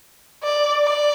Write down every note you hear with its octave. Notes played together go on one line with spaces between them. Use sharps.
D5
D5